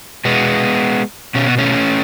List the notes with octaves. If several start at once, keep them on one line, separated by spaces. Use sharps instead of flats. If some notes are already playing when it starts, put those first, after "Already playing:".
B2 G#3 B3
B2 C#4
B3
A3 C#4